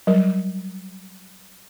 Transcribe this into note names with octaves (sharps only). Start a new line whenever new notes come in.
F#3 G3 A#4